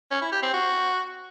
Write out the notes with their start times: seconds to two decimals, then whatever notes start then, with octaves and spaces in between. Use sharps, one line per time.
0.11 C#4
0.22 E4
0.32 G4
0.43 C4
0.53 F#4